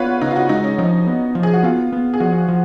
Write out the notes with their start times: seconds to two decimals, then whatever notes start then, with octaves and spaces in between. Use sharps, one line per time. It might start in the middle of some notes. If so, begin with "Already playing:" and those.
Already playing: B3 F4 B4 C#5 F#5
0.21 C#3 D#4
0.31 F4
0.36 F#4
0.49 G#3 D#4
0.64 C#4
0.78 F3 D#4
1.07 B3
1.35 F3
1.43 G#4
1.54 F#4
1.63 B3 F4
1.92 B3
2.14 G#4
2.20 F3 F#4
2.48 F3